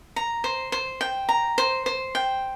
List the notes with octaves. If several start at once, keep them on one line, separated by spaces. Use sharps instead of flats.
A#5
C5
C5
G5
A#5
C5
C5
G5